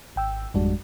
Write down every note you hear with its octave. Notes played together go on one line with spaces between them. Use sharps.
G#1 G5 E6
G#1 F2 G3 G#3 D4 F#4